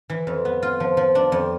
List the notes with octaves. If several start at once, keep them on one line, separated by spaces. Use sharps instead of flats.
E3
F2
B3
F4
F3
F3
D4
F2